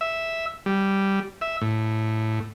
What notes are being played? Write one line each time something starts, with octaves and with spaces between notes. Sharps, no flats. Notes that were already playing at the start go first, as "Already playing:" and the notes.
E5
G3
E5
A2